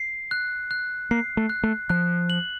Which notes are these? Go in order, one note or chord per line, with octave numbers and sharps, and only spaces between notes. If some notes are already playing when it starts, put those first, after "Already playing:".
Already playing: C7
F#6
F#6
A#3 C7
A3
F#6
A3
F3 F#6
F#7